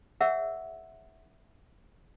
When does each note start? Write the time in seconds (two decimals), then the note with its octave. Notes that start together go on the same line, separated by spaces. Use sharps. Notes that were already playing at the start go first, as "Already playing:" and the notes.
0.21 G#4 A#4 C#5 E5 F#5 E6